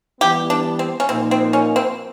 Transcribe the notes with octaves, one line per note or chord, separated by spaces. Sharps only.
E3 G3 B3 G4
D4
C4
C#4
A#2 F3 A#3 C4 D#4
C4
C#4
C4